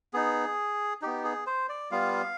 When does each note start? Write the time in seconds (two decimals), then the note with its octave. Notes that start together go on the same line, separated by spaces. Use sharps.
0.13 B3 D#4 G#4
1.02 B3 D#4 G4
1.24 G#4
1.47 C5
1.69 D5
1.91 G3 B3 F4 F5